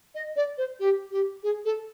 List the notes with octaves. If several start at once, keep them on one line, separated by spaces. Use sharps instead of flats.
D#5
D5
C5
G4
G4
G#4
A4